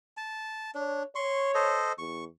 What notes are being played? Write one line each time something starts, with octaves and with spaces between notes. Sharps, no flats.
A5
D4 C#5
C#5 C6 C#6
A4 C5 D#5
E2 C#6